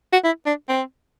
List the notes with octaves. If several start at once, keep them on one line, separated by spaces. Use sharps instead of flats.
F#4
E4
D4
C4